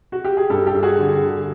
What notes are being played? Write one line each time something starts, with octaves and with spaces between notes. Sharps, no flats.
F#4
G4
G#4
G2 G4 A4
G4 A4
G2
F#4 G#4
D3
D3